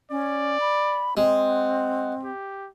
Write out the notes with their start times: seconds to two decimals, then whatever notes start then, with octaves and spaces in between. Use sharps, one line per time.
0.11 C#4 D5
0.60 B5
1.17 G#3 C4
1.48 F#5
2.23 G4